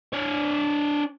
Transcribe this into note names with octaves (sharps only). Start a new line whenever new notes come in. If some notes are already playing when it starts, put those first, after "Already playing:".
D4 C#5